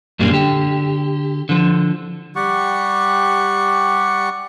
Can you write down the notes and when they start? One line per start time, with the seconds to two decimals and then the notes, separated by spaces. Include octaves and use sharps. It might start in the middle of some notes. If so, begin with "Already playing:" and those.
0.19 F#2 A#2 G3 A#3 D4
0.31 D3 G4
1.49 D3 F3
2.36 G3 G4 F#5 C#6